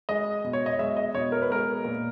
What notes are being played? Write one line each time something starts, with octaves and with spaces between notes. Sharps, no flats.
G#3 D#5
B2
C#5
D#5
G#3 E5
D#5
B2 C#5
A#4
B4
G#3 A#4
A#2